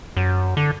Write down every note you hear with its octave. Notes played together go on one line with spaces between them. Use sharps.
F#2
D3